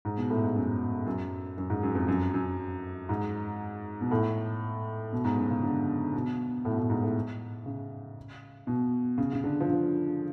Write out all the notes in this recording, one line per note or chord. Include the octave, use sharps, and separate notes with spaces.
G#2
B2
A2
G#2
F#2
F#2
F#2
G#2
F#2
F2
F#2
F#2
G#2
B2
A2
B2
G#2
F#2
C#3
D3
B2
A2
B2
A2
G#2
A2
C#3
B2
C#3
C#3
D3
F3
D3